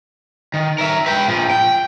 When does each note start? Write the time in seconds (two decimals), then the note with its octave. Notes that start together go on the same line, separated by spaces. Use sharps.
0.54 D#3
0.78 A#4 E5
1.06 B4 G5
1.28 A#2 F3
1.51 G5